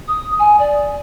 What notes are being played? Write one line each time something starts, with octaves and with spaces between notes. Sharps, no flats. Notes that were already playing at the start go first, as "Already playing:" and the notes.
D#6
G#5
D5